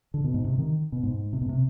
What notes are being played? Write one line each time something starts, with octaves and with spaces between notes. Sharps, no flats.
D3
B2
G#2
C3
D#3
B2
G#2
C3
B2
C3